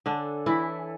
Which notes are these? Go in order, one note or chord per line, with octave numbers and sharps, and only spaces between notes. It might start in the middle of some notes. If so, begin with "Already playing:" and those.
D3 D4 A4 C#5 G#5
E3 E4